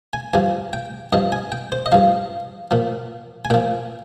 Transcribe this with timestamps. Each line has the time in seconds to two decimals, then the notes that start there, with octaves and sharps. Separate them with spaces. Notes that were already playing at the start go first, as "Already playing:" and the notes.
0.13 G#5
0.33 G2 F3 G#5
0.73 G5
1.13 G2 F3 D#5
1.32 G#5
1.52 G5
1.72 C5
1.86 D#5
1.92 G2 F3 F5
2.71 A#2 F3
3.45 G#5
3.50 A#2 F3 G5